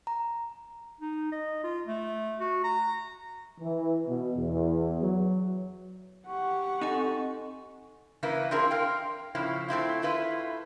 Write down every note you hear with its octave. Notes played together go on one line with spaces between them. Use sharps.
A#5
D#4
D#5
F4
A3
F#4
A#5
E3
B2
E2
F#3
G4 F#5 C#6
C4 D#4 A4 G#5
C#3 E3 A#3 E4 B4
C4 D4 E4 F4 G#4 A#4
A#4 F5 G5
A2 C#3 F3 E4
A3 C4 E4 F4
A3 E4 F4 B4